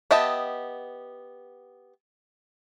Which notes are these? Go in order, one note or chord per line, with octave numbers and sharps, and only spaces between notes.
B3 G4 D#5 E5 A5